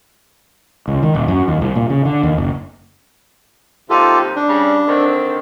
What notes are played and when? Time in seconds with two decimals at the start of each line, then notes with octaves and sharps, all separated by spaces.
0.88 C#2
1.03 D#3
1.15 D#1
1.28 F#2
1.48 D#2
1.61 C2
1.76 A#2
1.90 C#3
2.05 D3
2.23 D#2
2.38 F#1
3.90 D#2 C3 D#4 F4 G4 A4
4.36 D4
4.47 C#3 G3
4.88 D3 D#3 C4